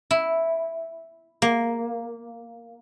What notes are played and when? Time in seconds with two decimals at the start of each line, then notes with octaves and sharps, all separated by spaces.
0.11 E4
1.42 A#3